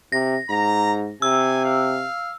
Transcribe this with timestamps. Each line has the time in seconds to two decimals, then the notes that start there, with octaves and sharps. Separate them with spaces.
0.12 C3 A#6
0.50 G#2 A#5
1.22 C3 G#5 E6
1.65 F5